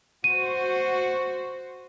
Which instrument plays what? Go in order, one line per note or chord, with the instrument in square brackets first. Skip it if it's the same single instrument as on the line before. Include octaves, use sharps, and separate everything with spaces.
[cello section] F#4 C5 [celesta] D#7